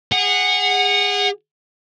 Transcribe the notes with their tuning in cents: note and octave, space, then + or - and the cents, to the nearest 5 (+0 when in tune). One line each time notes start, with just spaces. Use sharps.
G#4 -30 F#5 +0